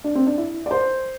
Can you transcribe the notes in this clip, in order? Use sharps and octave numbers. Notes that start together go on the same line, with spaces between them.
D4
C4
D4
E4
D5
C5